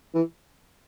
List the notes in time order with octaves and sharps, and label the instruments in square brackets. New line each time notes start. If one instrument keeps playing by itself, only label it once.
[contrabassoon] E3